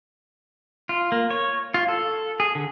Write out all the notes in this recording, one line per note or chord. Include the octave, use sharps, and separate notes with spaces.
F4
A#3
C#5
F4
A4
G#4
D3